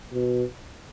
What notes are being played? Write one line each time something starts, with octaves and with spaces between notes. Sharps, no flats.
B2